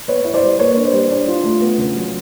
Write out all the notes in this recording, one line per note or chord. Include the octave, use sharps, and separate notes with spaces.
B3 B4 C#5
E4
C5 D5
G3
A#3 B4 C#5
D4
C5 D5
G3
D4
F4
A3
B3
C#3
F#3